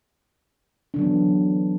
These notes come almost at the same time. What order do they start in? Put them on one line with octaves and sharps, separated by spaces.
D4 D3 F#3 B3 E3